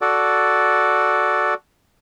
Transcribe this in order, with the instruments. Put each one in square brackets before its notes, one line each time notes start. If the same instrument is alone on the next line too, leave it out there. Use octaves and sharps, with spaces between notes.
[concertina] F#4 A4 D5